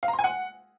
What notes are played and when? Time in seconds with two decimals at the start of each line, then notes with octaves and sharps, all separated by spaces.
0.03 F5
0.08 A#5
0.13 C6
0.19 G#5
0.24 F#5